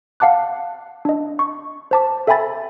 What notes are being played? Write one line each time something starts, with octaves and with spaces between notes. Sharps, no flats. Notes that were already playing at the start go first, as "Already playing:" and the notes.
F5 F#5 A5 D6 F#6
D4 D#5
C#6
C5 A5 D6
A4 E5 G5 G#5 B5 A6